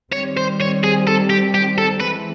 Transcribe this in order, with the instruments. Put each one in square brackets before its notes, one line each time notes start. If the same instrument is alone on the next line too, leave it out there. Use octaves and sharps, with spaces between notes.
[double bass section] D#3 G3 C4 [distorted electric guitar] C#5
[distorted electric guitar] C5
C#5
G#4
A4
G4
G4
A4
[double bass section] E3 G#3 C4 [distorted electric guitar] B4